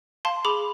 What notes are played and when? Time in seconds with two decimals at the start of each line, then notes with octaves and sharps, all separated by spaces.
0.25 F5 A5 C6
0.45 G#4 B5 D6